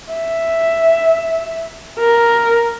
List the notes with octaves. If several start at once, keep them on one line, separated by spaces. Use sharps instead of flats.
E5
A#4